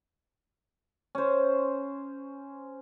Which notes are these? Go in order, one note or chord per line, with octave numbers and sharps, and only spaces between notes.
C#4 C5